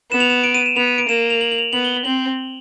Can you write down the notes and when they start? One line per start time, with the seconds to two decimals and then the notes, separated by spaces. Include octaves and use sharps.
0.12 B3 E7
0.20 F7
0.30 E7
0.44 D7
0.55 D#7
0.66 E7
0.76 B3 F7
0.87 D#7
0.98 D7
1.09 A#3 E7
1.30 F7
1.41 F#7
1.52 F#7
1.58 F7
1.62 F#7
1.73 B3 F#7
1.85 G7
1.94 F#7
2.05 C4 F#7